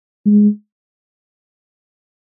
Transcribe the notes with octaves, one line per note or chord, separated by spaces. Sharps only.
G#3